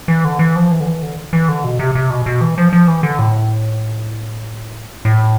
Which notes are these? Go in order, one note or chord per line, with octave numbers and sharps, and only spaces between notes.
E3
D3
E3
F3
E3
D3
E3
D3
E3
D3
B2
C3
C3
B2
B2
E3
F3
F3
E3
D3
A2
A2